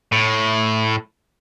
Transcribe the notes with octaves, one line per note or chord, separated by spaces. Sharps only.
A2